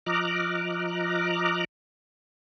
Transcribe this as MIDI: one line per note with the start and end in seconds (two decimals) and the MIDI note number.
0.06 1.64 53
0.06 1.64 75
0.06 1.64 82
0.06 1.64 86
0.06 1.64 89
0.06 1.64 90